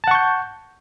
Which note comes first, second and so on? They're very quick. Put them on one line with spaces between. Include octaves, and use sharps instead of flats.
A5 F#5 C#6 G6